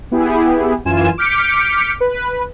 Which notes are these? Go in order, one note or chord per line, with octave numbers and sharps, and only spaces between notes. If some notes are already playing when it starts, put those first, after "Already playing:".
B3 E4 G4 G#4
F#2 E3 F4 G#5 E7
D6 F6 G6 B6 C#7 D7
B4